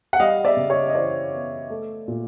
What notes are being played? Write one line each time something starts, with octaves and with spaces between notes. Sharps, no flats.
F#5
G3 D#5 F5
D5 E5
C#3
C#5 D#5
D#5
E3 C5 D5
B3
A3
A#2